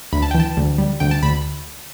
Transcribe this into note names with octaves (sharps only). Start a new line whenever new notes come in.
D2 B5
A5
E3 G5
A5
D2
G3
D2 G5
A5
D2 B5